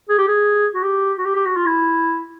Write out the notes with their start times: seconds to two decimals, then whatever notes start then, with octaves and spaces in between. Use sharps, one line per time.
0.09 G#4
0.19 G4
0.28 G#4
0.75 F#4
0.84 G4
1.18 F#4
1.26 G4
1.36 G4
1.46 F#4
1.56 F4
1.66 E4